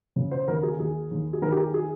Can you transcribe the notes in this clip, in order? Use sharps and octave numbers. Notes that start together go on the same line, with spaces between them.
C#3
C5
D#2 A#4
G#4
D#2 G#4
D#2
G#4
D#3 A#4
G4
G#4
G#4